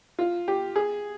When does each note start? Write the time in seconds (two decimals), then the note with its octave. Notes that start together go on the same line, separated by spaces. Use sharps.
0.19 F4
0.48 G4
0.76 G#4